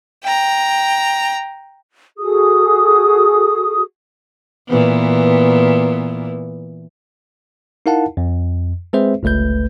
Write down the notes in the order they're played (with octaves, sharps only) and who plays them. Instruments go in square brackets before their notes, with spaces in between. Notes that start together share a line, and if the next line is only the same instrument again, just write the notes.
[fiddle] G5 A#5
[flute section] F#4 G#4 A4 D#6
[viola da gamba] A#2 E3 B3
[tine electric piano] D#4 E4 A#4 F5 F#5 A5
F2
G#3 C4 G#4 B4 C5 E5
G1 C#2 A3 B4 G6